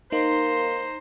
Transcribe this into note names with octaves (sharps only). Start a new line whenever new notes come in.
A#3 D#4 C5 A#5 C6